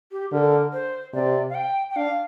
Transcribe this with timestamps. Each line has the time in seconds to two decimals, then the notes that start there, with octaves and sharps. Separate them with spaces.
0.11 G4
0.32 D3 A#4
0.72 C5
1.13 C3 D5
1.49 F5
1.55 G5
1.90 G5
1.96 D4 F5